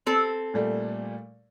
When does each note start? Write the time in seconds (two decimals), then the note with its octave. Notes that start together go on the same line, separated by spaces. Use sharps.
0.07 C4 A4
0.54 A#2 G3 A3